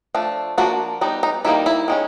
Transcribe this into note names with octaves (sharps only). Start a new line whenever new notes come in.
F3 A3 D4
F3 A#3 D4 F#4
G3 B3 D#4
D#4
D#3 G3 A#3 D#4 E4
E4
D#3 G#3 C#4